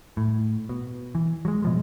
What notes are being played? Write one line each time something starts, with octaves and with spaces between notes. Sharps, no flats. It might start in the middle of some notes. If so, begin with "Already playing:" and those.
A2
B2
E3
F#3 G#3
B2 F3 G#3